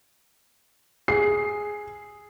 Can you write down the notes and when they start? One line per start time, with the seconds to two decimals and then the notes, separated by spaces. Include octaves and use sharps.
1.08 G#4 C7